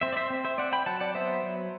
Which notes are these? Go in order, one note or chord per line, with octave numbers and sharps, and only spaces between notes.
C4 C5 E5
D5
C5 E5
C4
C5 E5
C4 D5 F#5
G5 B5
F#3 F#5 A5
D5 F#5
B3 C5 E5
F#3